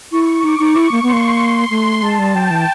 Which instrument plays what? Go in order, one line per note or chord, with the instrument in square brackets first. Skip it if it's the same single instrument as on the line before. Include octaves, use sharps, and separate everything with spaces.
[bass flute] E4 [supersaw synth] C#6
[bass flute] D#4 [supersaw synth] D6
[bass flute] D#4
[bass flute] E4 [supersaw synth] C#6
[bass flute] A#3
[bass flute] B3 [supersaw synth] C6
[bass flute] A#3
A3
[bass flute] G#3 [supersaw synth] A5
[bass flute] G3
[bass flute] F#3 [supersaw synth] G5
[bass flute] E3